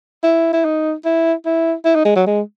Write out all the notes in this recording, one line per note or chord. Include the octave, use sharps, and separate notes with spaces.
E4
E4
D#4
E4
E4
E4
D#4
G#3
F#3
G#3